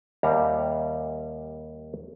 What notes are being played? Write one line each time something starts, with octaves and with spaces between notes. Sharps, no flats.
D#2 G3 E5 A#5